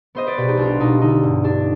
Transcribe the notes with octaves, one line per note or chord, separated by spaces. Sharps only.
B3 C5 D#5
B4 D5
B2 G4 B4
D#4 G4
B1 D4 F4
B2 D#4
D3 D#4
G2
G2 D4